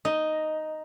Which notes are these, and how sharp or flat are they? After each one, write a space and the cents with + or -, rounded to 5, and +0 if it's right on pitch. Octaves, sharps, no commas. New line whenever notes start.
D#4 +0 D#5 +0